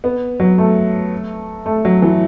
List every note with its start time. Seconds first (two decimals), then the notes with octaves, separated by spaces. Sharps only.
0.04 B3
0.40 F#3
0.58 A3
1.66 A3
1.85 F#3
2.02 E3